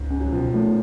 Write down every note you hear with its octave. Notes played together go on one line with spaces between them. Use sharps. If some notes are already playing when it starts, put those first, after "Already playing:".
Already playing: C#2 G#2
C#4
F#3
B2 F3
A3